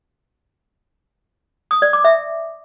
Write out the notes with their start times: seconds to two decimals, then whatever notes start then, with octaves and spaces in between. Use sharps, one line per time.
1.71 D#6
1.82 D5
1.93 D6
2.04 E5